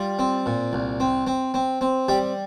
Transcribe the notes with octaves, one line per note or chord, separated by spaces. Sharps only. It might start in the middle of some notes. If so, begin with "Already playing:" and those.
Already playing: G3 F4
C4
A#2
C2
C4
C4
C4
C4
G3 G4